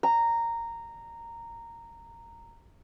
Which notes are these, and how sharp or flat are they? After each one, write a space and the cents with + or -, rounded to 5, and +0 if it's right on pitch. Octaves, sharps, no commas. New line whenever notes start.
A#5 -10